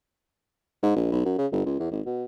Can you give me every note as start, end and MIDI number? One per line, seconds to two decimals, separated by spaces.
0.83 0.95 44
0.96 1.07 34
1.12 1.25 35
1.25 1.36 42
1.38 1.47 49
1.52 1.61 31
1.66 1.77 37
1.80 1.87 40
1.91 2.01 32
2.06 2.25 47